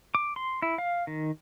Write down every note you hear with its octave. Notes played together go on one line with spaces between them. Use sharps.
D6
C6
E4
F5
D#3